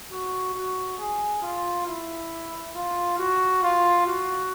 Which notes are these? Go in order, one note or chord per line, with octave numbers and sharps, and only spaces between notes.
F#4
F#4
G#4
F4
E4
F4
F#4
F4
F#4